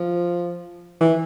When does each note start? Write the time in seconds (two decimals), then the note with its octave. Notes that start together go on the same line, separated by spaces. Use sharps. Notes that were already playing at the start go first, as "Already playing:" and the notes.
Already playing: F3
1.01 E3